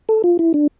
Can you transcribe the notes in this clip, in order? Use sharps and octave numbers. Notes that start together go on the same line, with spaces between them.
A4
F4
E4
D4